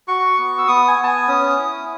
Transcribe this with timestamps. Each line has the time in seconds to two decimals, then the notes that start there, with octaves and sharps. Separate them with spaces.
0.08 F#4 C#6
0.38 B3
0.58 E6
0.68 B3 D#6
0.88 G#5
0.98 B3
1.03 A5
1.08 G#5
1.28 C#4 D#6
1.58 E4